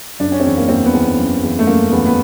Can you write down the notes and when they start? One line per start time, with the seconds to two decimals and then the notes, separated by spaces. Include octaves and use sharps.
0.19 F#1 D4
0.32 C#4
0.40 C4
0.44 E2 C#4
0.57 A#3
0.69 E2 C4
0.86 B3
0.93 E2
1.18 F#1
1.43 E2
1.59 A3
1.67 F#1 A#3
1.92 E2 B3
2.06 B3